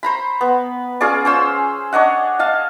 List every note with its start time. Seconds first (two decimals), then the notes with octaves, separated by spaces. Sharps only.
0.03 C5 A#5 B5
0.41 B3
1.01 C#4 F4 G#4 D5
1.25 C#4 C5 E6
1.93 D4 C#5 D#5 F#5
2.39 D#5 F5 A5